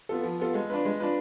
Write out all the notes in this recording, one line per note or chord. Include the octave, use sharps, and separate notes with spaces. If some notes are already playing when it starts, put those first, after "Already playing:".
B3 F4 A4
F3
B3 F4 A4
G#3
D4 F4 B4
G#3
D4 F4 B4